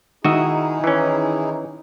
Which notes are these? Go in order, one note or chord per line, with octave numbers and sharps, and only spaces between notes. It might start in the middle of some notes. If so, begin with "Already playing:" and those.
D#3 D#4 E4 F#4 G#4 D#5 E5
E3 C#4